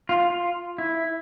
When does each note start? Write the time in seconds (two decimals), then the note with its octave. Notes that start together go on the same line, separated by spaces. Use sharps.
0.09 F4
0.30 F4
0.78 E4